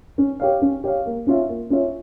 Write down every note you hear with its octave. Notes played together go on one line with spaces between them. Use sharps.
C#4
G4 C#5 F5
C#4
G4 C#5 F5
A#3
C#4 F4 C#5 E5
A#3
C#4 F4 C#5 E5